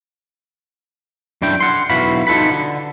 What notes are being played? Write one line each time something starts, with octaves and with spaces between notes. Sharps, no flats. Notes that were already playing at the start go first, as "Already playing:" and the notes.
F#2 D4 E4 G5
F#5 C6
B1 E4 F#4 B4 F5 B5
D#4 F4 A4 B4 B5
D3